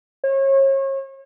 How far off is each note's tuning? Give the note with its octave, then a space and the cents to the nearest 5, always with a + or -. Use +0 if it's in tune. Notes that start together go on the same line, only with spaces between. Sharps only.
C#5 -35